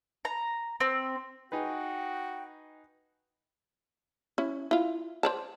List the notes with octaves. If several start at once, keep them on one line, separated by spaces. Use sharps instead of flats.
A#5
C4
D#4 F#4 G#4 B4 G5
C#4 E4
E4 F4
C5 D5 A5